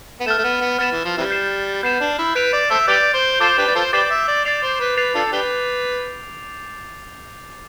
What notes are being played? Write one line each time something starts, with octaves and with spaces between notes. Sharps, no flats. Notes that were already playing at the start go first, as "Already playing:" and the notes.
B3
A3 F6 A6 E7
A3
B3
B3
B3 F6 A6 E7
E3
F3
C3 E3 G3
G6 C7 E7
B3 G6 C7 E7
D4
E4
B4 G6 D7 F7
D5
A4 C5 E5
G4 B4 D5 G6 D7 F7
C5
F4 A4 C5 D6 A6 C7 E7 G7
D4 G4 B4
D5
F4 A4 C5
G4 B4 D5 D6 A6 C7 E7 G7
E5
D5
D5 A6 C7 F7
C5
B4
B4 A6 C7 F7
D4 F4 A4
D4 G4 B4